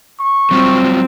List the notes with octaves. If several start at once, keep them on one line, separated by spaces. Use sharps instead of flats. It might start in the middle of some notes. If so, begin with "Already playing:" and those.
C#6
F#3 G3 C4 F4